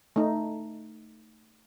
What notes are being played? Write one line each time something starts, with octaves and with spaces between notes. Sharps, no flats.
A3 D#4